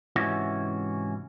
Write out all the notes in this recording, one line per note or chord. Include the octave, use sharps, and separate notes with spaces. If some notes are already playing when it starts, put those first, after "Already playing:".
G#2 C3 E3 C#4 E4 F#4